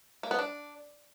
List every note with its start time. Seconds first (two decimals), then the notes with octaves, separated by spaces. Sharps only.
0.23 A#3
0.31 B3
0.39 D4